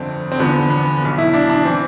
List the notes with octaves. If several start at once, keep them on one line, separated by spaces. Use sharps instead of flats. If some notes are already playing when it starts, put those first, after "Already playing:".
Already playing: G1 F2 D3 C4
C4
E2 D3 F3 B3
B3
B1 B2
E4
D4
D4
E3 C4